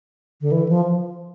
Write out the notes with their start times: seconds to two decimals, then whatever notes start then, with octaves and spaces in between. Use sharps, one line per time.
0.41 D3
0.52 E3
0.69 F3